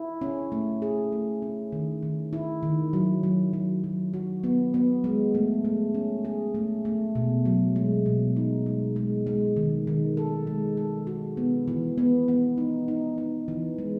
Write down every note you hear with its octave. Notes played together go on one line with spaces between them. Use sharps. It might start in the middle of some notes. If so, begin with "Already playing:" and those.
Already playing: E4
C#4
A3
G#4
A3
C#4
D#3
D#3
E4
D#3
F#3
F#3
F#3
F#3
F#4
B3
B3
G#3
A3
A3
C#4
G#4
A3
A3
B2
F#3
G#3
B2
D#4
G#3
G#3
G#3
D#3
D#3
A4
G#3
A4
F#4
B3
E3
B3
B3
D#4
D#4
D#4
E3
G#3